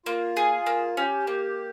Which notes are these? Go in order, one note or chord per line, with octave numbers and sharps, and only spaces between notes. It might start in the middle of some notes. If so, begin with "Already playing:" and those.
A#3 F4
G#4
A#3
C#4 G4
A#3